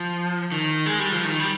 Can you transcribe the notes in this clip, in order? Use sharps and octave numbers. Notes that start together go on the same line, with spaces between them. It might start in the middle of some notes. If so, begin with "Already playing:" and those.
Already playing: F3
D#3
G#3
G3
F3
D#3
G3